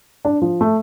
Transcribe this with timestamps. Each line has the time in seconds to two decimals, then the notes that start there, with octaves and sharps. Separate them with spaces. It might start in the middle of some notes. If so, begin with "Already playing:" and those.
0.25 D4
0.42 F3
0.61 A3